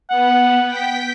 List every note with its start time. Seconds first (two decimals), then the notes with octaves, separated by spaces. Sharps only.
0.10 B3 F#5
0.66 G5 B6